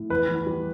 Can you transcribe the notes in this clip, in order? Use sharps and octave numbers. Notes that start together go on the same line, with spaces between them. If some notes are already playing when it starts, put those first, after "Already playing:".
Already playing: A2
E2 B4
E2
G3